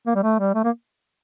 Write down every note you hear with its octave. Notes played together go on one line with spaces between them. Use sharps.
A#3
G3
A3
G3
A3
A#3